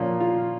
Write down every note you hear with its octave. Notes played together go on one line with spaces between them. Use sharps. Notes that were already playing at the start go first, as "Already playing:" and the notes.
Already playing: A#2 F3 C#4
F4